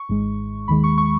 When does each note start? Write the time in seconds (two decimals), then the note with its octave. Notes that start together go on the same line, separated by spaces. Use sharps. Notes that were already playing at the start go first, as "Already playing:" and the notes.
Already playing: C#6
0.09 G#1 G#2 G#3
0.68 D#2 D#3 G#3 B5
0.84 C#6
0.98 C#6